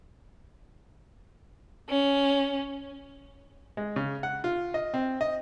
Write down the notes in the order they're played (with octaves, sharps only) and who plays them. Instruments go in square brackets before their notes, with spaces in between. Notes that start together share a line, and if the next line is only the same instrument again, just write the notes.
[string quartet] C#4
[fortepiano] G#3
C#3
F#5
F4
D#5
C4
D#5